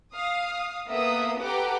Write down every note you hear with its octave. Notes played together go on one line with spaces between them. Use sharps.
F5 D#6
A#3 B3 A4 E5 D#6
G4 A4 B4 F#5 A#5 D6